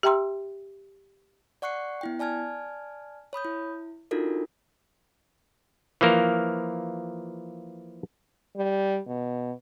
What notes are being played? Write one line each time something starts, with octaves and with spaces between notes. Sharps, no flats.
G4 E5 G5 A#5 C6 E6
D5 F#5 C#6 F#6 C7 C#7
B3 E4 G5
D5 G#5 A5 F6 G#6
C#5 B5 D#6 G6
E4
D4 D#4 F4 F#4 A4 A#4
E3 F3 A#3 A#4
G3
B2